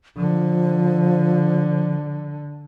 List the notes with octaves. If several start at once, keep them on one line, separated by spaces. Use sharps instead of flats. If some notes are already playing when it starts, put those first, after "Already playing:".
D3 F3